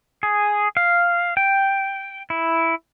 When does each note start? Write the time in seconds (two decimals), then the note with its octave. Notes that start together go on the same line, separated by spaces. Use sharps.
0.23 G#4
0.77 F5
1.37 G5
2.30 E4